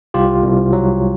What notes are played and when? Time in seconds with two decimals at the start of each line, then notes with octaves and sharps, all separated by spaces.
0.14 C2 F4 G4
0.43 C2
0.73 F#3